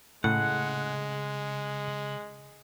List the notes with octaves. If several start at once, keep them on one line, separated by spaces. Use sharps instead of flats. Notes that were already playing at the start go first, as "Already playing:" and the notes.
A2 C#3 G#3 F#5